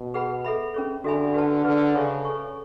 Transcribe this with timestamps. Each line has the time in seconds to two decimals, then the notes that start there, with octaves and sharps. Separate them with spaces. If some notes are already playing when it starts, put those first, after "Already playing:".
Already playing: B2
0.14 G#4 B4 F#5 B5
0.44 A4 E5 B5
0.74 C#4 G#4 C#5
1.04 D3 F#4 A4 E5 G#5 B5
1.34 F#4 B4 F#5 A5
1.65 D3 G#4 B4 D5
1.95 C#3 A4 C#5 E5 G#5 C#6
2.25 A4 C#5 G#5 C#6